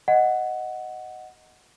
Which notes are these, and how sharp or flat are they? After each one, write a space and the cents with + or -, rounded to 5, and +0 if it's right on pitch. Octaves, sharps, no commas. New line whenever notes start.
D#5 +0 F#5 +0